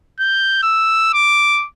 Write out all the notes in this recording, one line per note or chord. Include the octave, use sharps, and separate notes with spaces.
G6
E6
D6